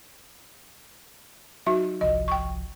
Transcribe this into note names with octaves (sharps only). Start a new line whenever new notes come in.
F#3 D#4 F#4 E5
G1 C2 F3 D#5
G5 C#6